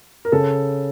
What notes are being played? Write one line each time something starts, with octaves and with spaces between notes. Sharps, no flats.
A#4
C#3 A4